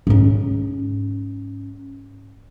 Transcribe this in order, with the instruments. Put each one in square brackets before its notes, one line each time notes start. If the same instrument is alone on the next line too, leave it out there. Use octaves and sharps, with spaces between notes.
[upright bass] G#2 C#4